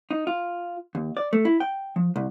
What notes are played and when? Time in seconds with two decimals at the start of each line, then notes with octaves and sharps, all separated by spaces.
0.11 D#4
0.27 F4
0.95 D#2
1.17 D5
1.33 A3
1.45 E4
1.60 G5
1.96 F3
2.16 C2